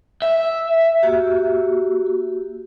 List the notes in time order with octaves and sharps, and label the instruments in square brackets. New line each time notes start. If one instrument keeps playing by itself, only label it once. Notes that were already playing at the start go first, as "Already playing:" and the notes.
[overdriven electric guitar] E5
[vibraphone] A#3 F#4 G4